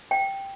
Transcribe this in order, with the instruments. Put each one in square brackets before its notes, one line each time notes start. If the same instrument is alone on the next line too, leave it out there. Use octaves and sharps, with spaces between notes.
[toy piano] G5